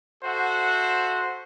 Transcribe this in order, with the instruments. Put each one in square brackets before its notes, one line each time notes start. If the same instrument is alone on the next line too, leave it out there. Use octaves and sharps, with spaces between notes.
[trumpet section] F#4 A4 C5 E5 F#5